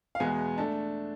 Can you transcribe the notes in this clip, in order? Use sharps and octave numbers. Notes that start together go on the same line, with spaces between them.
F5
E2 B2 G#3 B3 G#5
A3 D4 A5